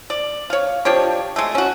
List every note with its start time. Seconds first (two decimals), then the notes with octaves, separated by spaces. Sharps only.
0.10 D5
0.50 C#5 F5
0.85 F3 D4 G4 C#5
1.36 G#3 A3
1.55 C#4 F#4